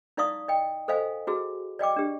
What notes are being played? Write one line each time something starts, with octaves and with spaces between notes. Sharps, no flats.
D#4 E4 D5 F5 C#6 D#6
D#5 G5
A4 C5 D#5 F5 G#5
E4 F#4 G#4
D5 D#5 G5 D6
D4 G4